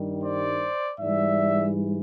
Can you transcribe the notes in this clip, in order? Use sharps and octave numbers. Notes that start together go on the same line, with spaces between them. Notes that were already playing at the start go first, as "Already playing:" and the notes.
Already playing: G2 D#3 G3
C5 D5
G#2 E3 G3 D5 E5